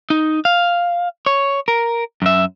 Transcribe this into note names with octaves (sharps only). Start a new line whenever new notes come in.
D#4
F5
C#5
A#4
F#2 E5